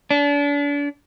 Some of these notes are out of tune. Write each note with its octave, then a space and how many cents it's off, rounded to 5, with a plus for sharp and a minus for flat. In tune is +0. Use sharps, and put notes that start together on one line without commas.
D4 -35